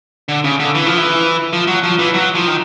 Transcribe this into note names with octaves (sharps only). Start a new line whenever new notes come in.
D3
C#3
D3
E3
F3
E3
F3
F#3
F3
E3
F#3
F3
D#3